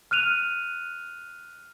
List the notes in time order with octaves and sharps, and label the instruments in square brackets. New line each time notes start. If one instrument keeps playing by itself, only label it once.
[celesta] F6 F#6 D#7 F7